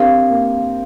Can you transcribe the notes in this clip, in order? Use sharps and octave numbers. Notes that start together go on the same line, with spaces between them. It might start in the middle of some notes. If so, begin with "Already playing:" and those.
Already playing: C4 D4 G4 A#4 F5
A#3